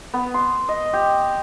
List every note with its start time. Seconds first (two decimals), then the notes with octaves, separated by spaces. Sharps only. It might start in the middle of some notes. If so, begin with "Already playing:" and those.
0.14 B3
0.34 C6
0.69 D#5
0.93 G4